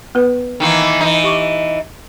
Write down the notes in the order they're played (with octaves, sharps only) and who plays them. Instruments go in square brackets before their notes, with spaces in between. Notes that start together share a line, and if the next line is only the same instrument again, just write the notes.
[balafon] B3 B4
[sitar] D#3 E3 A#3
E3 D#4
[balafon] G4 C#6 D6